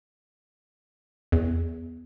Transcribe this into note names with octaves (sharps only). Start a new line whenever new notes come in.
E2